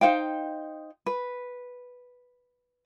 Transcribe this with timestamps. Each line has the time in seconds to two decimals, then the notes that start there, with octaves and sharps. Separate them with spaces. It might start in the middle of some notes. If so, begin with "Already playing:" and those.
0.01 D#4 C5 F5 G5
1.06 B4